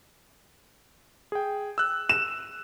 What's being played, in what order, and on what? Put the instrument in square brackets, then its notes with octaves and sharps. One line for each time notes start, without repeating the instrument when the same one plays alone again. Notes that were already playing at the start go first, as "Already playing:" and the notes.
[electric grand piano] G#4 G5
E6 F#6
[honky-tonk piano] E7